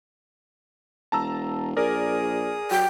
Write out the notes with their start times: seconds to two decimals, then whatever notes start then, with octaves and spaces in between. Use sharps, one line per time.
1.12 E1 A5 A#5 E6
1.77 A#1 G#4 A#4 D5 D#6
2.71 F#3 G5